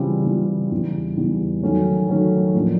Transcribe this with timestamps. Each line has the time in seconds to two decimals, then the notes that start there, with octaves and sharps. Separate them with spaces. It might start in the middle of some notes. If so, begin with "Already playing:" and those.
Already playing: C#3 E3 G3 C4 F4
0.26 C#3 E3 G3 C4 F4
0.71 E2 C#3 E3 G3
1.17 E2 C#3 E3 G3
1.63 D#3 F#3 A3 C#4
2.09 D#3 F#3 A3 C#4
2.54 A2 F3 A#3 D4